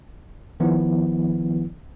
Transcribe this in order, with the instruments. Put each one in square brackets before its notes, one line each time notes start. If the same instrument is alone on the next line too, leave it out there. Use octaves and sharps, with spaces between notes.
[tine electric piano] D#3 F3 B3 E4